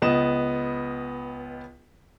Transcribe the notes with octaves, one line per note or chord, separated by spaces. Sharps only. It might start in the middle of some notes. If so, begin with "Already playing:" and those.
C#2 B3 D#5 E7